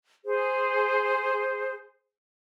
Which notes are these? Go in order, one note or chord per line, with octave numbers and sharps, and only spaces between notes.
G#4 C5